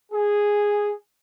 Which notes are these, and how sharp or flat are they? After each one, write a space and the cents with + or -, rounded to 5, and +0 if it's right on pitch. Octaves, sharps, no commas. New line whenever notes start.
G#4 -5